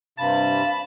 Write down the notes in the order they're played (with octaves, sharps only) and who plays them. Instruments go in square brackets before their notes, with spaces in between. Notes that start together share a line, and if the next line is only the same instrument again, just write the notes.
[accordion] G2 C3 [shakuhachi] F5 [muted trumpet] A5 [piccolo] B5